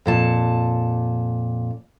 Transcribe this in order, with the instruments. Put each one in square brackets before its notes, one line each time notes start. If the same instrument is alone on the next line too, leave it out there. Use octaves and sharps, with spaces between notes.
[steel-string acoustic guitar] F2 A#2 A5